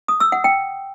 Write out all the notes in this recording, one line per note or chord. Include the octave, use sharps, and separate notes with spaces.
D#6
E6
F#5
G5